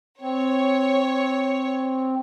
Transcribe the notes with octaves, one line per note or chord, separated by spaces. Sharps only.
C4 C#5